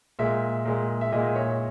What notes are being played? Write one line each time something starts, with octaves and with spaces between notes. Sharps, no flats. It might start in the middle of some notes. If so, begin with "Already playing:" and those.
A#2 G#3 E5
A#2 G#3
E5
A#2 G#3 D#5
C#5